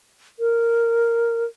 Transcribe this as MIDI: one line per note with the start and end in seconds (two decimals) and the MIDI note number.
0.40 1.44 70